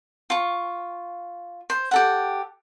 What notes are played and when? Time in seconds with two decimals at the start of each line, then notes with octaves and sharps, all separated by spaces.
0.30 F4 C#6
1.70 C5
1.91 G4 A4 F#5